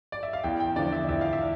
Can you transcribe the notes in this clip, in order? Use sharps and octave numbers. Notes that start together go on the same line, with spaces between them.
D5
E5
F5
E2 G5
G5
D3 F3 D5
E5
E2 E5
F5
E5